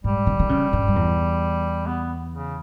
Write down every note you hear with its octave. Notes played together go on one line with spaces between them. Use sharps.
G#2 G3
D#3
D#3
C#3
G2
G2
E2
B3
C#3